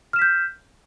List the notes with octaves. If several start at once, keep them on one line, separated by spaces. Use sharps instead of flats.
F6 G6 B6 E7